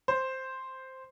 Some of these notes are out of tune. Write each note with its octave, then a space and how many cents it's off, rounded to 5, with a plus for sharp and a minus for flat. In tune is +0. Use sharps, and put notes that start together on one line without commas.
C5 +0